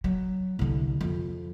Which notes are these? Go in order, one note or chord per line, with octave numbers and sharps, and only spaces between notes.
F#3
C2 D3
F2